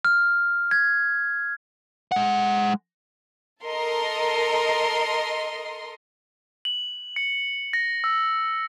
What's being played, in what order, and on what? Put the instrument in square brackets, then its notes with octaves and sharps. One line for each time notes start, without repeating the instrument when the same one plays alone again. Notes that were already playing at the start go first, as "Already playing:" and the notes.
[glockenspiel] F6
G#6
[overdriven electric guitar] G#3 F#5
[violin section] A4 A#4 D#5 C6
[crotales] F#7
C#7
A#6
E6